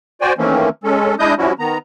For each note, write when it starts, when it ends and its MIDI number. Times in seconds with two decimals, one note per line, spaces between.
0.21 0.33 66
0.21 0.33 72
0.21 0.33 74
0.21 0.33 79
0.21 0.33 80
0.38 0.69 51
0.38 0.69 52
0.38 0.69 57
0.38 0.69 58
0.38 0.69 60
0.38 0.69 61
0.84 1.15 56
0.84 1.15 61
0.84 1.15 69
1.19 1.34 56
1.19 1.34 62
1.19 1.34 64
1.19 1.34 75
1.19 1.34 87
1.19 1.34 91
1.38 1.53 53
1.38 1.53 55
1.38 1.53 61
1.38 1.53 64
1.38 1.53 66
1.59 1.78 51
1.59 1.78 59
1.59 1.78 82